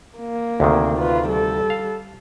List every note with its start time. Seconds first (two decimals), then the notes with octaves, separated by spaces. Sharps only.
0.18 A#3
0.60 D2 C3 D#3
0.99 F4 B4
1.28 G3 A4
1.70 F5